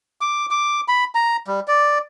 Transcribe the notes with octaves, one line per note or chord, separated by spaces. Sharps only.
D6
D6
B5
A#5
G3
D5